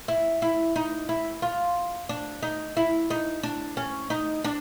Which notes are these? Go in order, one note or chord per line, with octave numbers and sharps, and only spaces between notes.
E4
E4
D#4
E4
F4
D4
D#4
E4
D#4
D4
C#4
D#4
D4